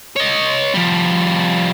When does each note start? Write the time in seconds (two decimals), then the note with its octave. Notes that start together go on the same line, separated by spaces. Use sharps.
0.16 C#5 D#5
0.74 F3 G3